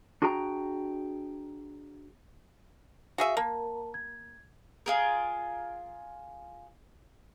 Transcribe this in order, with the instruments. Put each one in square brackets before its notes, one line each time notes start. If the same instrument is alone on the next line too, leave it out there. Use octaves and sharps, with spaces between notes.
[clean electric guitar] D4 F#4 G#4 G5 A#5
[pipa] F#4 G#4 E5 [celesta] F5
[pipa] A#3 [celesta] A#4 A5
[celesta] G#6
[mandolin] F4 G#4 A#4